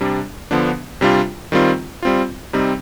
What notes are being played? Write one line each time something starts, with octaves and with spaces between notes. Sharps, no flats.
C3 G3 D4
D3 F3 B3 D4
C3 G3 D4 F4
D#3 G3 C4 F4
G3 C4 F4
C3 G3 C4 D#4